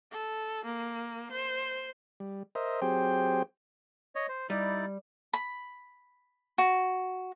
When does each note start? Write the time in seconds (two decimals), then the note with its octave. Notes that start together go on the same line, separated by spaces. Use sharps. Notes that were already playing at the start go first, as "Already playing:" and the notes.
0.12 A4
0.65 A#3
1.32 C5
2.20 G3
2.55 A#4 C5 D#5 E5
2.82 F#3 C4 G4 G#4 C5 G5
4.15 C#5 D#5
4.29 C5
4.50 G3 D#4 E4 D5
5.33 B5
6.58 F#4